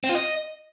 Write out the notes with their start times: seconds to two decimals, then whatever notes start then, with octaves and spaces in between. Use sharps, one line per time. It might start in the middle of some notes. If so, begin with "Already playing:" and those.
0.04 C4
0.09 F4
0.15 D#5